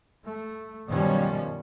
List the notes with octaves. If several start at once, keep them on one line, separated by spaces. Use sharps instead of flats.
A3
F#2 B2 D#3 F3 G3 C#4